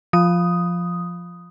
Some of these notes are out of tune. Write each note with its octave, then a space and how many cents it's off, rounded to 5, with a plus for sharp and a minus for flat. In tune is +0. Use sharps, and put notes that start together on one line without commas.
F3 +0 D#6 +0